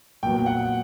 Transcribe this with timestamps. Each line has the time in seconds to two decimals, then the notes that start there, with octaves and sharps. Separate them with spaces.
0.23 A#2 F#3 B3 G5
0.46 F#5